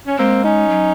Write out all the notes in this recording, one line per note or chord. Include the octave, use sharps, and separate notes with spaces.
C#4
G#3 A#3 C4
C#4 D#4
F#3